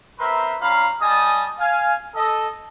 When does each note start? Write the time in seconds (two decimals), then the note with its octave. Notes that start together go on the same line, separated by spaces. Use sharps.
0.19 C4 A#4 B4 E5 A#5 C6
0.60 G3 C#4 F4 F5 A#5 B5
1.00 G3 D#5 G#5 A5 D#6
1.59 F5 G#5
2.14 A4 D#5